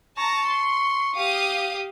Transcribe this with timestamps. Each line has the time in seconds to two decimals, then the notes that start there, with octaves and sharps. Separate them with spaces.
0.18 A5 A#5 C#6
0.50 C6
1.17 G4 F5 D#6